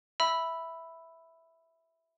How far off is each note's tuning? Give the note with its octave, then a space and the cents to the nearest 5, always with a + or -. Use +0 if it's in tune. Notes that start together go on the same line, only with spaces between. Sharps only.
E5 -5 B5 +0 E6 +0